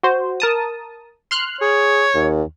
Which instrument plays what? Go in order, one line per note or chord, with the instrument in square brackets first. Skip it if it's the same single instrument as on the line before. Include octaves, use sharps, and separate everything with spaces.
[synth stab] F#4 C5
A#4 A5 D#6
C6 F6 F#6
[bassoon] G#4 [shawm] C#5
[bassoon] D#2